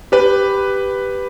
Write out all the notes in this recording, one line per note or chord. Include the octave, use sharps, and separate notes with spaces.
G4 B4